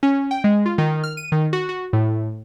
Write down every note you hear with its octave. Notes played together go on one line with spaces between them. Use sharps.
C#4
G5
G#3
F4
D#3
F6
D#7
D#3
F#4
F#4
A2